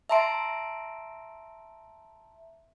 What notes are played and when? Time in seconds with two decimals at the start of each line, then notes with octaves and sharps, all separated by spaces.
0.09 E5 A5 A#5 C6 D7